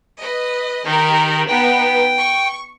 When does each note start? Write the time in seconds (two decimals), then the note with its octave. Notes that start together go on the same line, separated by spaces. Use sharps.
0.18 B4 D#5
0.85 D#3 D#4 G4 A#4
1.48 B3 D#4 B4 G5
2.17 C#6